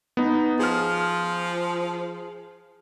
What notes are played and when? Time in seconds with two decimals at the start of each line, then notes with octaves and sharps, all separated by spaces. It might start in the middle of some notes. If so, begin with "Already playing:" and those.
0.17 B3 D#4
0.59 F3 G#4 F6